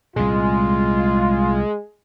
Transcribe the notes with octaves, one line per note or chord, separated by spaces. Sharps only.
C2 A#2 G#3 F4